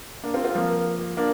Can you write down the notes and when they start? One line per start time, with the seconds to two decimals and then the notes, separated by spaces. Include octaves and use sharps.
0.23 A#3 D4
0.34 C4 F4
0.44 C4 F4
0.55 F3 A#3
1.17 A#3 D4